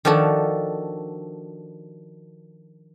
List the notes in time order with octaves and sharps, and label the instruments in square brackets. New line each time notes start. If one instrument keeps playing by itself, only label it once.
[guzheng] D#3 F3 D4 F#4 A4